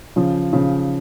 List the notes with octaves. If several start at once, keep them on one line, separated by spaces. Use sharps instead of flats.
C#3 F3
C#3 F3